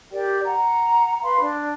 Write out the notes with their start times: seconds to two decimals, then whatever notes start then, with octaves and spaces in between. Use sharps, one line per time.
0.12 G4 A#4 D5 G5
0.44 F#5 A#5
1.22 B4 F5 B5 C6
1.41 D4